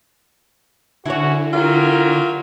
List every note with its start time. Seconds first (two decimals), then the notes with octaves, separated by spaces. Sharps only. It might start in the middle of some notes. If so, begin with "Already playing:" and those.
1.06 D3 C#4 E4 F#4 C#5
1.53 F#3 F4 G4 A#4